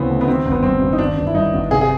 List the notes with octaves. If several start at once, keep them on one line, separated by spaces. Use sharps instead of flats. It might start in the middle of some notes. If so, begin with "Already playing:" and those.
Already playing: D2 C#3 E3 B3 C4
A3
B3
D#3 C4
G1
B3
G2 C4
G1
D#4
D#3 D4
G1
E4
G2 D#4
G1
C3 G#4
G#4